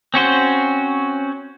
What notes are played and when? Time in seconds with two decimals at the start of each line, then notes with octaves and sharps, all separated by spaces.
0.14 C4 C#4 F#4 C5